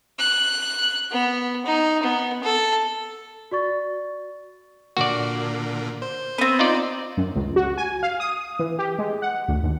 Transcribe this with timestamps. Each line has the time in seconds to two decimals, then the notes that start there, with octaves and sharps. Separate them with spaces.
0.19 F#6
1.11 B3
1.66 D#4
2.03 B3
2.43 A4
3.51 F#4 D5 C#6 A6
4.97 A#2 D3 A#3 F#4 D5
6.02 C5
6.38 B3 C4
6.59 D#4 F4 D5
7.17 F#2
7.35 C#2
7.56 F#4
7.77 G#5
8.03 F5
8.20 D#6
8.59 E3
8.79 G4
8.98 G#3
9.22 F#5
9.48 D2
9.63 D#2